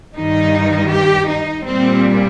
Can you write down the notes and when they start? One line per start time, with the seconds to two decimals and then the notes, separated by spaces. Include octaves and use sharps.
0.15 G2 D#3 G3 D#4
0.89 G4
1.27 D#4
1.64 A#2 G3 C4